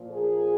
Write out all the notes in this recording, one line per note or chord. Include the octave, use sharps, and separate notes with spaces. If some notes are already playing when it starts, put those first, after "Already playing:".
Already playing: A#2 F3 A#3
G#4